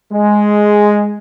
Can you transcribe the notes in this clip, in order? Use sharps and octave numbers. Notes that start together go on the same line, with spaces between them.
G#3